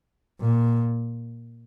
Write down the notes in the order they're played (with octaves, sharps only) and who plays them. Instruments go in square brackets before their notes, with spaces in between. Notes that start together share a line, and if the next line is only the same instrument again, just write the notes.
[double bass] A#2